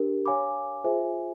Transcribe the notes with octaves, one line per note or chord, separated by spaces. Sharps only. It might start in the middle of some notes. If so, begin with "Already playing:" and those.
Already playing: D4 G4 A#4
C#5 F5 G#5 B5 D6
F4 G#4 C5 E5 G#5